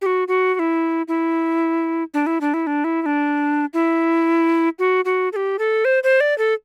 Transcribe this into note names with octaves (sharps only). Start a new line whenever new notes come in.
G4
F#4
F#4
F#4
E4
E4
D4
E4
D4
E4
D4
E4
E4
D4
E4
F#4
F#4
A4
G4
A4
C5
C5
D5
A4